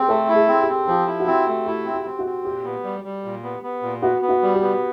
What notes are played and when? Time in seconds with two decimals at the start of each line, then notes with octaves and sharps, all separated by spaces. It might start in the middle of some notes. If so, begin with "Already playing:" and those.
Already playing: C4 G4 G#4
0.08 A3 A4
0.29 E4
0.35 G#4
0.48 C4
0.62 G4
0.68 C4
0.87 F3 G4
1.07 E4
1.20 F#4
1.27 C4 G4
1.47 A3
1.66 E4 G4
1.85 C4
1.93 G4
2.05 C4
2.19 F#4
2.26 C4
2.44 A#2 G4
2.64 B3
2.84 G3
3.04 G3
3.24 A#2
3.43 B3
3.63 B3
3.82 A#2
4.02 B3 F#4
4.22 B3
4.29 F#4
4.42 G3
4.55 G4
4.61 B3